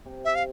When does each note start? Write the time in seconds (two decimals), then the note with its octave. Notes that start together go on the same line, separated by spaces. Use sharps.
0.06 C3
0.25 E5
0.35 F5